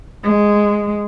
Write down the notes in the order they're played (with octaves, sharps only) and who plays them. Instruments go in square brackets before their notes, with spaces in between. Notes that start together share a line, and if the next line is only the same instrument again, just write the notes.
[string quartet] G#3